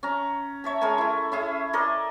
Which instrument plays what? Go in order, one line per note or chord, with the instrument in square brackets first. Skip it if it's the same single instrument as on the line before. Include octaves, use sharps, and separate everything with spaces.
[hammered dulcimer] C#4 A#5
C#5 E5 A5
G#3 A#4 C#5 G#5
E4 A4
C#4 E4 G#4
A4 A#4 D5 D#5